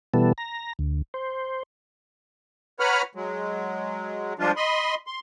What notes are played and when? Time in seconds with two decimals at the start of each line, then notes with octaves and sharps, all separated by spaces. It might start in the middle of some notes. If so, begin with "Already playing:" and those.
0.14 B2 E3 G3 B3 A4
0.38 A#5
0.79 D2
1.14 C5
2.80 B4 C#5 F#5 A#5 B5 F6
3.15 F#3 G#3
4.39 F3 G3 G#3 D4 F4
4.57 D#5 B5 C6
5.07 C6